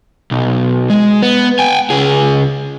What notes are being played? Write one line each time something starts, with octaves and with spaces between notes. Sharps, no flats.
B1
G#3
B3
G5 G#5
C#2 G#4